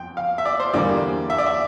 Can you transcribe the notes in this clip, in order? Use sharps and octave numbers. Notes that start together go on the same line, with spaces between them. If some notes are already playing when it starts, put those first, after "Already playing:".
Already playing: F2 G5
F5
E5
D5
C5
E2 D3 G3 A#3 D5
E5
D5
E5